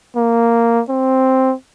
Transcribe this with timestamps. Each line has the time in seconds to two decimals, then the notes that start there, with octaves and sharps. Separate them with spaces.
0.16 A#3
0.89 C4